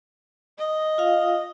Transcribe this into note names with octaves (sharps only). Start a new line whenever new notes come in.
D#5
F4 F5